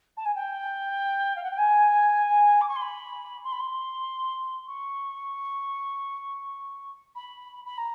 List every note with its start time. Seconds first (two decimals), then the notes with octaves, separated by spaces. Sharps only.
0.17 A5
0.25 G#5
0.35 G5
1.36 F5
1.43 F#5
1.51 G5
1.58 G#5
2.61 D6
2.68 C#6
2.76 C6
2.82 B5
3.44 C6
3.52 B5
3.59 C6
4.68 C#6
7.15 B5
7.65 B5
7.78 A#5